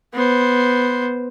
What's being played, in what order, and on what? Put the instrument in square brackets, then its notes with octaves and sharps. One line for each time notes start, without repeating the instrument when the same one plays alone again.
[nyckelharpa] B3 C5